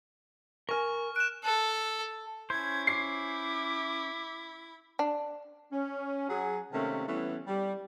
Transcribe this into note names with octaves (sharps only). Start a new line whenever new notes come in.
A#4 G#5 C#6 F6
F#6 D7 E7
A4
C#4 E4 C5 G#6
D6 C7
D4
C#4
F#3 G#4
C3 D#3 A3 A#3 C#4
E3 G3 A3 B3 C#4
G3